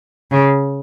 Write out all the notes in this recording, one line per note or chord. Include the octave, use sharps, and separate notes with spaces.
C#3